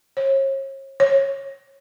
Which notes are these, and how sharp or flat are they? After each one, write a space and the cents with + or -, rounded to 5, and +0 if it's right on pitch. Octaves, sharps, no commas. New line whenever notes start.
C#5 -40
C#5 -15